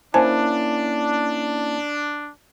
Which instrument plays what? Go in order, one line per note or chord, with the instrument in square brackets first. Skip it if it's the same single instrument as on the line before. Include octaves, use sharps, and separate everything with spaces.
[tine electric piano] A#3 C#4 E4 [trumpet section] D4 [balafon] C5 G#5 A5